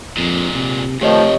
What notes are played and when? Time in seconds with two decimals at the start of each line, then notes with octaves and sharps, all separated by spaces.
0.17 F2 A#2 G#3
0.54 C3
1.01 F2 C3 D#3 F3 A3 G4 C#5 D#5